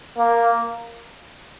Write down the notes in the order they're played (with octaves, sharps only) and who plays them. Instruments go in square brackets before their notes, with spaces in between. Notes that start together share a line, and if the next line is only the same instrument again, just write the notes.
[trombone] A#3